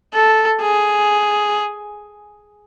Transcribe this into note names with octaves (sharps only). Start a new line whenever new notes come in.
A4
G#4